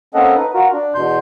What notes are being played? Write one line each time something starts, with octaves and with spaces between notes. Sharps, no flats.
A#3 C4 C#4 A4 D#5 F#5
D#4 B4
F4 F#4 A#4
D4
E2 B2 C6 G6